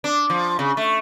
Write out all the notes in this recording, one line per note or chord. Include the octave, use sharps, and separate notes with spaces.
D4
F3
C#3
A3